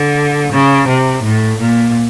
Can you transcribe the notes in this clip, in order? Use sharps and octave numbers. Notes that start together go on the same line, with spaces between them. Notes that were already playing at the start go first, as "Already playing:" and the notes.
Already playing: D3
C#3
C3
A2
A#2